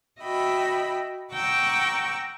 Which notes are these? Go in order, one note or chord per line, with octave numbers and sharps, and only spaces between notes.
F#4 D#5 E5 G5 B5
F#5 G5 A#5 C#6 D6 E6